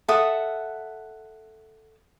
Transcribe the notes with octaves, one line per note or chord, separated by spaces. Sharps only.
A4 E5 F#5 D#6